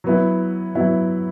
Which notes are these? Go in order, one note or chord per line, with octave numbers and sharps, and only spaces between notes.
F#3 B3 E4
F#3 B3 E4